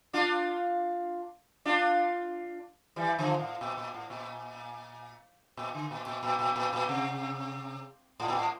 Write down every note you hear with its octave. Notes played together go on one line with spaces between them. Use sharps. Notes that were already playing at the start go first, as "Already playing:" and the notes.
D4 F4
D4 F4
E3 G3
D3 F3
A2
A#2
A#2
A2
A#2
A#2
D3
A#2
A#2
A#2
A#2
A#2
A#2
C3
A2
A#2
A2